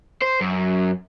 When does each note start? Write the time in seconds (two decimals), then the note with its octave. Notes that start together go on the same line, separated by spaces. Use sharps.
0.22 C5
0.41 F#2